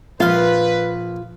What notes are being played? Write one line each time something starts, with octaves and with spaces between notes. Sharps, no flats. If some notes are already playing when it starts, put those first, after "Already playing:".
A#1 F4 B4 F5